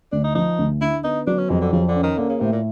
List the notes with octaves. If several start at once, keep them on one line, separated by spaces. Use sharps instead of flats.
D2 D4
D#4
F3 D#4
D2
D3 E4
B3 D#4
F#3 D4
C#4
F2 G#3
D3
C#3 F3
D3
C#4
D#3
D3 A#3
C#3
A2 C3
A#2